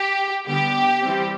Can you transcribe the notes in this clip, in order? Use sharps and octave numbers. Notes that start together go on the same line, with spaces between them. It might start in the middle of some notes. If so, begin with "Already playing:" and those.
Already playing: G4
D3 G3 B3 G4
E3 G3 C4